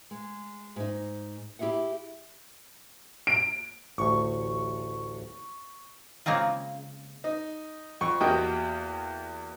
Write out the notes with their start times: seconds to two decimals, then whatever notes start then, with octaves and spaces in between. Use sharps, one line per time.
0.11 G#3
0.76 G#2 D#4
1.59 E4 G4 G#4 E5 F#5
3.27 D7
3.98 A1 D2 C#6
6.26 C#3 G#3 A#3 C4 F4
7.24 D#4
8.01 F2 C#6
8.21 E2 A#3 F#4 G4 D#5 G5